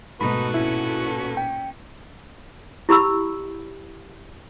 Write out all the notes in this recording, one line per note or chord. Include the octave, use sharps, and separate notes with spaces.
G#2 B2 A3 D#4 F#4 A4 B4 B5
A#2 C#4 E4
G5
E4 G4 B5 E6